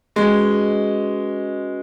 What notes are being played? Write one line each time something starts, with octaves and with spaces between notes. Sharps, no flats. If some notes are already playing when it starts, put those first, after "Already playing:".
G#3 C#4 F#4 B4 D#5